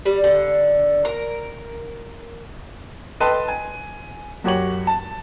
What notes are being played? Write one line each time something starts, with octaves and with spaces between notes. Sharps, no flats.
G3
D3
A#4
A4 B4 D#5 G5 A5 C6
G#5
F#2 F#4 G4 C#5 C#6 F#7
A5